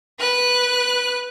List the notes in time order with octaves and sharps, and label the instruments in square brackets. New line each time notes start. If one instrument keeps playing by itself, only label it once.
[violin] B4 F#6